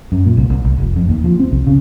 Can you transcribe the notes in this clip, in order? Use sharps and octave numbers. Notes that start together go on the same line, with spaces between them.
F#2
A#2
C2
C2
C2
F1
F2
D#2
F3
C4
C2
C#3